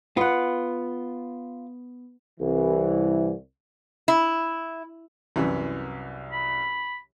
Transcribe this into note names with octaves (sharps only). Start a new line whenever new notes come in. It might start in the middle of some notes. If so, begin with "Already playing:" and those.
B3 F4 F#5
C2 E3
E4
C2 F#2 E3
B5